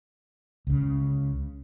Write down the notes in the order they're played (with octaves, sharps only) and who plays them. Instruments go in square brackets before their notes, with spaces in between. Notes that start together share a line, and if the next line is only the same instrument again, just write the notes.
[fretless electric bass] C#2 C#3